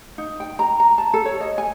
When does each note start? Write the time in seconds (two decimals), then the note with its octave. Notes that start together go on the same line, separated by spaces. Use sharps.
0.18 D#4
0.40 G5
0.59 A#5
0.80 A#5
0.98 A5
1.14 A4
1.25 C#5
1.40 D#5
1.58 G#5